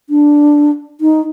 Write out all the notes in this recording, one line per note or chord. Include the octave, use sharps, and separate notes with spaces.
D4
D#4